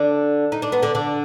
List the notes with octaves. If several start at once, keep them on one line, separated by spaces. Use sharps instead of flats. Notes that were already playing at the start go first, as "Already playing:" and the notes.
Already playing: D3 D4
D#4
D4
B3
D3 D4
D3 D4